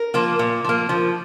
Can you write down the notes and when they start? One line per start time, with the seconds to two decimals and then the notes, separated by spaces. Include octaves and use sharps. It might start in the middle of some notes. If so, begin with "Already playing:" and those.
Already playing: A#4
0.14 F3 A#3
0.39 A#2
0.64 F3 A#3
0.89 F3